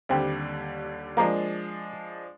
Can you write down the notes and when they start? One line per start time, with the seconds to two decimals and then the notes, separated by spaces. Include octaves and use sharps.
0.09 D#2 D3 G3 C4 D4 G4
1.17 F3 G#3 A#3 D4